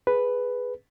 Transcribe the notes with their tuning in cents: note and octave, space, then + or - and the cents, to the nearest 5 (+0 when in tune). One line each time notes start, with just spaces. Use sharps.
G#4 +0 B4 +0